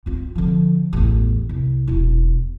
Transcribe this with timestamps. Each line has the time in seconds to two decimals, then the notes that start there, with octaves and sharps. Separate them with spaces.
0.06 C4 F4
0.35 D3 F3
0.93 A1 E2
1.49 C2
1.88 E1 E4